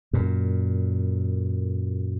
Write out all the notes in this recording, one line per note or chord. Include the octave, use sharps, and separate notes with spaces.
F#2 A#2